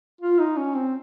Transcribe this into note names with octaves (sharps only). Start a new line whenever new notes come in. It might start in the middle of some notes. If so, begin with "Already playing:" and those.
F4
D#4
C#4
C4